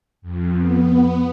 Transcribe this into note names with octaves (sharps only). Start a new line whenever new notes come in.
F2
B3
B3